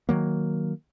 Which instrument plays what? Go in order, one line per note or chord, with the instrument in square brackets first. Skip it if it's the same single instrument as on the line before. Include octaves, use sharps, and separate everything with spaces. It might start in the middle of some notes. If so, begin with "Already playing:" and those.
[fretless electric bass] D#3 F#3 A#3